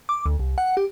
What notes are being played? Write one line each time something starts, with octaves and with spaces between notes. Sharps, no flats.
D6
D2
C2
F#5
G4